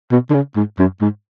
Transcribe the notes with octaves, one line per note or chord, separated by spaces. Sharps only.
B2
D3
C#3
G#2
F#2
G#2